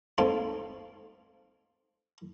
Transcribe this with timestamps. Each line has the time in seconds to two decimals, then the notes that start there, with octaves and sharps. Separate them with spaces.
0.18 G#2 A#3 C4 F4 A4